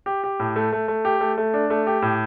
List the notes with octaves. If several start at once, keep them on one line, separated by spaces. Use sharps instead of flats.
G4
G4
A2
A3
A3
A3
G4
A3
A3
D4
A3
G4
A2